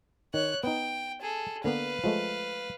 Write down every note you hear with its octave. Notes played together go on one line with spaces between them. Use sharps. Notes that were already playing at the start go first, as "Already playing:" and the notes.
D#3 C#5 F#6
B3 D#4 G5
G#4 A4
D3 A#3 B3 B4 F5
F3 G#3 A3